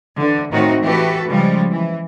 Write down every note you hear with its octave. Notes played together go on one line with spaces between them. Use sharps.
D3 E3
A2 D#3 A3 C4 D#4 F#4
E3 A3 F#4 G4 A4 B4
C#3 F3 G3 G#3
E3